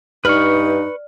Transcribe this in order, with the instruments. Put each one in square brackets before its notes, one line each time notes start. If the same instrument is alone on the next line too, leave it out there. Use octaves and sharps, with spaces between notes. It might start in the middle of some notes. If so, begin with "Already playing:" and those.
[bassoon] G2 [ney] D#4 [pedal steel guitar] B4 C#6 [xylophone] D5 F6 F#7